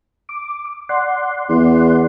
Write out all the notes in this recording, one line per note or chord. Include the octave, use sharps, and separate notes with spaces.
D6
D5 F#5 C6
E2